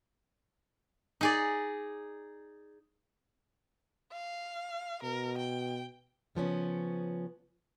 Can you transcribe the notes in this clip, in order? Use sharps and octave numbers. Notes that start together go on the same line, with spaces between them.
D#4 G#4 D5
F5
B2 A#4
G5
C#3 F3 B3 C#4